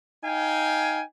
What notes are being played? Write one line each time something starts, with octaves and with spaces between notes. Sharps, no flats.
D#4 F5 G5 G#5